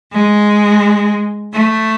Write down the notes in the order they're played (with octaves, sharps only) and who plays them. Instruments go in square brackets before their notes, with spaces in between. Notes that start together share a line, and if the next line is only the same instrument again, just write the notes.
[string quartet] G#3
A3